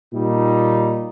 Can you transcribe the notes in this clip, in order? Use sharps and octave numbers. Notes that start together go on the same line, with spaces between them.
A#2 G3 A#3 D#4